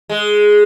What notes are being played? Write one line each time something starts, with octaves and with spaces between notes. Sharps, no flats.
G#3